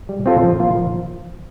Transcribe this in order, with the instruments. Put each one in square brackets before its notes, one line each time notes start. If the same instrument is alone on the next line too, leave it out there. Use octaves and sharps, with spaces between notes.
[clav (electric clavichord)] G3
C4 F4 A4
F3
A#3 F4
F3